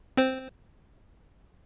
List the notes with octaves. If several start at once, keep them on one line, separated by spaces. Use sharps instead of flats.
C4 C5